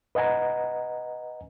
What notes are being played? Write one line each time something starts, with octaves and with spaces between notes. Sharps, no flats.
B4 D#5 F#5 G#5 A#5